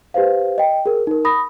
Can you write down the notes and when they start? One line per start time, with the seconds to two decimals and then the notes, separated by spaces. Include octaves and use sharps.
0.14 G4 B4 C5 F5
0.58 D#5 G5
0.86 G#4 A#4
1.07 D#4 A#4
1.25 B5 D#6 A#6